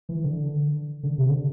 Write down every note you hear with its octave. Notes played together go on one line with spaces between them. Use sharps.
E3
D3
D3
C3
D3